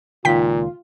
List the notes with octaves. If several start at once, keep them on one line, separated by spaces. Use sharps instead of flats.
C#2 A#2 D#3 F4 G5 B6